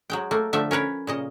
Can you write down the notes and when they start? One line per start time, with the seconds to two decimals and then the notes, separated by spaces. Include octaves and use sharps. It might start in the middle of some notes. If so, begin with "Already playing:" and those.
0.10 F#3 G#3 G5
0.31 A3 A#3
0.53 D3 F3 A3 E5
0.71 C#4 A#4 B4 C#5
1.07 A#2 C#3 D#5